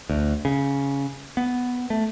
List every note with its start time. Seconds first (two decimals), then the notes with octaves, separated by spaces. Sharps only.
0.09 D2
0.45 C#3
1.37 B3
1.90 A3